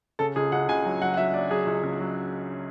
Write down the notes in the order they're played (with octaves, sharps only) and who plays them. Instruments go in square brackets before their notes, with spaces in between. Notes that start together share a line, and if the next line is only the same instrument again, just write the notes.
[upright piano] C#3 A4
C#2 G#4
C#2 F#5
C#2 G#5
F#3
F#3 F#5
F#5
F#3 E5
F#3 D5
F#3 G#4
C#2
C#3
F#3